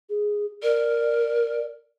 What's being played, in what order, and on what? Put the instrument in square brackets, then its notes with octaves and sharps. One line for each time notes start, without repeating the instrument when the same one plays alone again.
[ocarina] G#4
[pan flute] A#4 [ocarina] D5